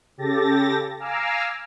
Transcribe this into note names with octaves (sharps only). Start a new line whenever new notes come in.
C#3 G4 A4 A6 A#6
F5 G#5 A#5 D6 E6 F6